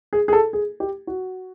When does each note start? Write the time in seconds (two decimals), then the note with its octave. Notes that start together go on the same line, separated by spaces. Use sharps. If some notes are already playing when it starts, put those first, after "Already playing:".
0.13 G#4
0.28 G#4
0.33 A4
0.53 G#4
0.80 G4
1.07 F#4